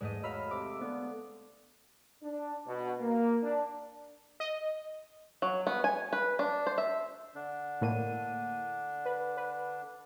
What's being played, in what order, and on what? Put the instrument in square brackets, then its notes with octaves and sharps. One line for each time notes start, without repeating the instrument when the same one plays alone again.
[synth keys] E2 G#2 [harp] G#3 A3 D#5
[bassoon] F#3 [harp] F5 B5 [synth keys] E6 F6
[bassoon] C3 [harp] D6
[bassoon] D3 [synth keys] B3
[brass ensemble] D4
B2
A#3
D4
[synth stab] D#5
[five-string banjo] F#3
B3
G#5
B4
D4
C5
E5
[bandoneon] D3 D4
[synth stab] A2 A#3 D#7
B4
B4